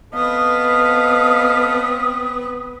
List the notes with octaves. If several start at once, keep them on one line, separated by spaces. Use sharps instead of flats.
B3 C4 A4 B4 D#5 F5 D#6